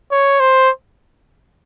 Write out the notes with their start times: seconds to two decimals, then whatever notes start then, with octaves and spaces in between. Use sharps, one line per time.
0.12 C#5
0.40 C5